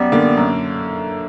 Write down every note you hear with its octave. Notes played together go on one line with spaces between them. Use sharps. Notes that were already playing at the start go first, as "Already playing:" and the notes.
Already playing: F#2 G3 B3
D3 A#3
F#2